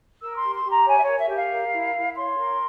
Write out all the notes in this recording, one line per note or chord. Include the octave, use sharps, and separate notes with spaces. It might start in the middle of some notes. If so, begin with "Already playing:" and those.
A#4 E6
C6
G4
C6
G4
A#5
C#5 G#5
E5
A#4 C#5
E5
G4
F5
A#4
E4
E4
C#5 C6
A#4